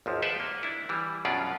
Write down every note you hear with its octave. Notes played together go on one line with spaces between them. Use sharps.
G#1 D#2 F3
G4 B4 C5 D5 E5 F#5
A#3
D4 E4
E3 G3
F#2 B2 C#4 D4 F4 D5